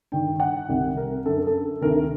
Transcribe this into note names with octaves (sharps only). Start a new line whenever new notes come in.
G2 D#3 G5
F#5
C2 C3 D#3
A#4
F#2 D3 A4
A#4
A4
D2 C3 D#3 A#4